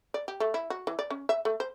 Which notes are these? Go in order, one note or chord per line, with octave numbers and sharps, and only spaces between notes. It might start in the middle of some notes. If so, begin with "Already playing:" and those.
D5
G4
A3
E4
F#4
E3
D5
C#4
E5
A3
C5